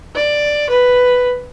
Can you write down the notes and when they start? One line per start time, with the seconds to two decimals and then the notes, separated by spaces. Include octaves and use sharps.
0.15 D5
0.69 B4